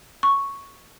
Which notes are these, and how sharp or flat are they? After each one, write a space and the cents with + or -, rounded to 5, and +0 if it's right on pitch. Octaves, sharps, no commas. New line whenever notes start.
C#6 +0